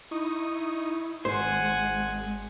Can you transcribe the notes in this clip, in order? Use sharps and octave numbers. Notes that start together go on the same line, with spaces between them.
D#4 E4 C#6 D#6
G#1 G#3 C5 F#5 G#5